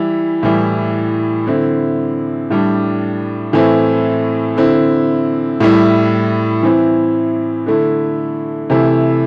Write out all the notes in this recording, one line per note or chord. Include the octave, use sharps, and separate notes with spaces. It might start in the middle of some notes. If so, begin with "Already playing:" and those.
Already playing: E3 G3 E4
A2 E3 G3 E4
D3 C4 E4
A2 G3 D4
A2 E3 A3 C4 E4
D3 C4 E4
A2 G3 E4
E3 C4 E4
D3 A3 E4
C3 E3 A3 E4